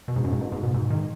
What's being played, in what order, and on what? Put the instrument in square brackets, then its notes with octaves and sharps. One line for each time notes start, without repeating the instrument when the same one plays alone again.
[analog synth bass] B2
G#2
F#2
G#2
B2
G#2
B2
G#2
D#3